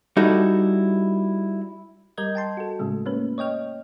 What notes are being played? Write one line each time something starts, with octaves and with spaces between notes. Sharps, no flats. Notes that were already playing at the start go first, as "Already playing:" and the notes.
G3 D#4 E4 F#4 A4
G3 A#4 D#5 G6 G#6
G5 A5 C6
F#4 A4
A2 C#3 G#3 A3
A3 A#3 C#4 B4
C#5 D#5 G5 F6